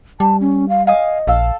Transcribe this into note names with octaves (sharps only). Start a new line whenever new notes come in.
G3 A5
C#4
F5
D#5 F5 G#5 D#6
A#1 A4 F5 E6